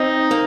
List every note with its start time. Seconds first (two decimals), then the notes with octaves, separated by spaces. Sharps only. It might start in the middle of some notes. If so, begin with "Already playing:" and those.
Already playing: C4 D#4 D#5
0.31 A#3